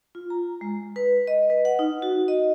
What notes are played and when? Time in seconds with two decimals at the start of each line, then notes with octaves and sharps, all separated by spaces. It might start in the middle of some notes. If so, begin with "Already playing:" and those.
0.15 F4
0.30 A#5
0.61 G#3
0.96 B4
1.27 D#5
1.50 B4
1.65 F#5
1.79 D#4
2.02 F#4
2.28 D#5